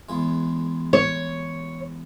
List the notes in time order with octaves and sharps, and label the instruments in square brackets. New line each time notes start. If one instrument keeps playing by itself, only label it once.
[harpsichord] E2 G#3
[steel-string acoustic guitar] C#5